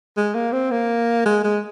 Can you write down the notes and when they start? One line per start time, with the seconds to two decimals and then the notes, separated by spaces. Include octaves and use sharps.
0.17 G#3
0.35 A#3
0.53 C4
0.71 A#3
1.26 G#3
1.44 G#3